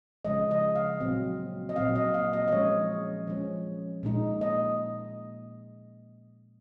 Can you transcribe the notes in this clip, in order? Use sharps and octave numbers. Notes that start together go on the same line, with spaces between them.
C#3 F3 G#3 D#5
D#5
F5
A#2 F#3 C4
D#5
A#2 F#3 C4 F5
D#5
F5
D#5
D#5
F3 G#3 C#4 C#5
F3 G#3 C#4
A#2 G#3 D#4
D#5